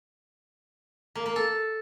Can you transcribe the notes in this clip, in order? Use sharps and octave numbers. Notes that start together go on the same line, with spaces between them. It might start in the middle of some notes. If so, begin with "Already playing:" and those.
A#3
A#3
A4